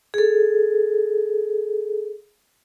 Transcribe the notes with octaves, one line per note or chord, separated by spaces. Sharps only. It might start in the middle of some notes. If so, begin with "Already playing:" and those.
G#4 A4